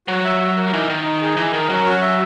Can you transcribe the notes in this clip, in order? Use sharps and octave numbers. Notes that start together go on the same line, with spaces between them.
F#3 F#4
E5
F#4
A#4
E3 D#4
D#3 D#5
D#4
G#4
E3 D#5
D#3 A#4
F#3 C#4
F#4
E5